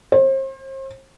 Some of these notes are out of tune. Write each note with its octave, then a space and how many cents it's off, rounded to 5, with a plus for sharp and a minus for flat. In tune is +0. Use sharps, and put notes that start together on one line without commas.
C5 +40